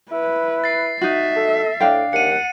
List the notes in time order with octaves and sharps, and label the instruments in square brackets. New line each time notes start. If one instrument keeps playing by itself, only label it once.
[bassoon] E4 [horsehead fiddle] B4
[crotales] A6 C7
[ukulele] D#4 F#4 [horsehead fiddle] E5
[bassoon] A4
[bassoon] A2 [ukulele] D4 F5 G5
[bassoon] D#2 [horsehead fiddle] F#5 [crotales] C#7 D#7